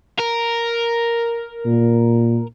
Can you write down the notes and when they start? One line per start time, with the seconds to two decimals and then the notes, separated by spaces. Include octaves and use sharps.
0.20 A#4
1.65 A#2